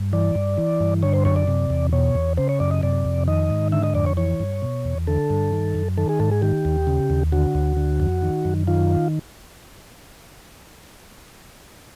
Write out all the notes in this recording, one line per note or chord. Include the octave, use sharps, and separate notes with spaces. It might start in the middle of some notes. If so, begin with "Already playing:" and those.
Already playing: G2
E3 D5
G2
E3
G2
D3 C#5
C5
F#2 C#5
D5
C3
E2
B2 C#5
E2
C#3 C5
C#5
F#2 D5
D#5
C3 D5
F2
D#3 D#5
G#2
D3 E5
D#5
F2 D5
C#5
E3 C#5
G2
B2
E2
D3 A4
G2
D#3
F#2
D#3 A4
G#4
G#2 A4
G#4
D#3 G4
D#2
C#3
D#2
D3 F#4
D2
D3
F2
D#3
F#2
D#3 F4